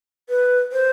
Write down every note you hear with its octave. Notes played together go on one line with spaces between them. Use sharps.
B4
C5